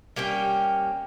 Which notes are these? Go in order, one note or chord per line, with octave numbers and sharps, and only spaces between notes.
G3 A#3 C#4 G5